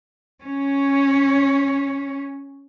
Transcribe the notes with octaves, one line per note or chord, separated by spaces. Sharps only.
C#4 C#5